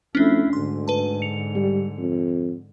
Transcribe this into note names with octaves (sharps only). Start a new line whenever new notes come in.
F2 A3 C#4 D4 E4
D2 G#2 D3 C6
B4 A5
C#7 F7
G3
F2